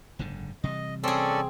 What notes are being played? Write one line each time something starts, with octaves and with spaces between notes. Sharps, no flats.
F#1 G#2 D3
C3 E3 G3 D#5
C4 C#4 G#4 A4 D5